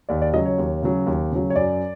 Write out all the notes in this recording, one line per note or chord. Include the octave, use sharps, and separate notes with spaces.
D#2 D5
D5
C#3 F#3 D#5
C#5
D#2
C#3 F#3
D#2
C#3 F#3
C#5
F#2 D5